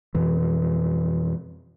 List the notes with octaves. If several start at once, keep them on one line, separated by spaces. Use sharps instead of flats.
F2 B2 E3